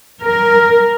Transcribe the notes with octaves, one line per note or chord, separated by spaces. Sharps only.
A#4